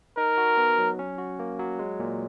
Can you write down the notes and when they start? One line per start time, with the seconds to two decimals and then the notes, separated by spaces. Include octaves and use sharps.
0.17 D#4 A#4
0.38 F#4
0.58 B3
0.79 F#3
0.99 C#4
1.18 F#4
1.39 A#3
1.59 F#3
1.79 G#3
2.00 A#2